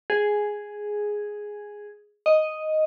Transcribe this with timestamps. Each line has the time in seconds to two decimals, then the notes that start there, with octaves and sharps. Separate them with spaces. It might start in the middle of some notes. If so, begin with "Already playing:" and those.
0.10 G#4
2.26 D#5